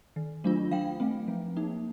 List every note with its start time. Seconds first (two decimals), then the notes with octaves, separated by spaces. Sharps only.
0.16 D#3
0.44 F#3 A3 D4 F4
0.71 F#3 F5 G5
1.00 A3 C4
1.28 F3
1.56 A#3 D#4